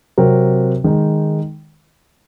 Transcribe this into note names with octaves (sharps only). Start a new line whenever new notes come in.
C3 F#3 C4 F#4 A#4
D#3 G#3 D#4